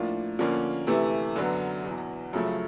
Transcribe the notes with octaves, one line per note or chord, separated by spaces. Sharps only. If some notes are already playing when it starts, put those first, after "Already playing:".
Already playing: A2 F3 A#3 D4 F4
D3 F3 A#3 C#4
C3 E3 A3
F#2 D3 F#3 B3
E2 B2 F#3
F#2 C#3 F3 A3